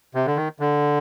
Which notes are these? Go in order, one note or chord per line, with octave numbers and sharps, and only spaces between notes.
C3
D3
D#3
D3